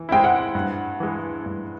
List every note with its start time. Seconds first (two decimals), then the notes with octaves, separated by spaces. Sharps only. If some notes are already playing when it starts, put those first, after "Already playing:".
Already playing: E3
0.09 G#3 C4 E4 G5
0.24 F#5
0.55 G2
1.00 E3 G#3
1.46 G2